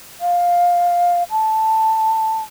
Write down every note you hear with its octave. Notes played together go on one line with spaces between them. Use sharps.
F5
A5